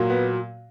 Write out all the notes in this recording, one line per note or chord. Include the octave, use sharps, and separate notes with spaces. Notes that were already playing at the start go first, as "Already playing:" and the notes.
Already playing: A#2 F#3
B3